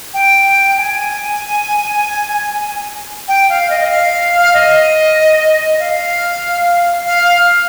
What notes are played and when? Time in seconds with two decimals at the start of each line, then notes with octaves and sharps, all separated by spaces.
0.14 G5
0.77 G#5
3.28 G5
3.49 F5
3.70 D#5
3.81 D#5
3.90 F5
4.53 D#5
5.79 F5
7.05 F5